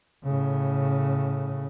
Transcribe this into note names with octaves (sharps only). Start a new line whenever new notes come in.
A2 C#3